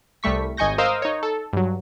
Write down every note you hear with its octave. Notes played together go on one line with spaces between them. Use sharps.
C2 G3 A3 C#6 B6
G#1 D#5 G#5 C#6 G6 A#6
A#4 C5 D#5 F5 D#6 E6
D#4 C#5
A4
G2 F#3